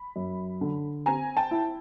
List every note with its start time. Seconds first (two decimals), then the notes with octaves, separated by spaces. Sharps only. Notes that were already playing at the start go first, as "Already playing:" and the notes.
Already playing: B5
0.16 F#2
0.61 D3
1.06 C4 G#5 A#5
1.37 G5 A5
1.51 E4